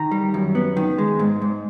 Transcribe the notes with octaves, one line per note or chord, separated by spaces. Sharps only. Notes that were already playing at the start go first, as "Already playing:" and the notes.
Already playing: D#3 A#5
G3
F#2
B3
D#3
G#3
G#2
G#2